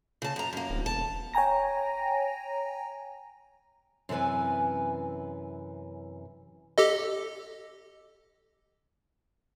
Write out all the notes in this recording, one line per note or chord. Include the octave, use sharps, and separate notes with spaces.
C#3 A5
F#2 A#5
F#2 A#3
D1
E1 A5
C#5 G5 G#5 A#5 A#6
F#2 C3 E3 B4 G#5
G4 A4 D#5